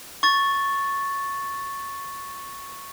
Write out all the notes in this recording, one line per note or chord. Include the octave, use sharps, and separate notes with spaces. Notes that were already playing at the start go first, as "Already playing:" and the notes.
C#6 A6